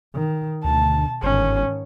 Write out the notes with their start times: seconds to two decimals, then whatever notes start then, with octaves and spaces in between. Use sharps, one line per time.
0.14 D#3
0.64 D2 B2 A5
1.23 G1 G#2 D#3 C#4